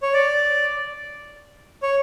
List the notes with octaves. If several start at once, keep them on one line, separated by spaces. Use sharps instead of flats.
C#5
D5
C#5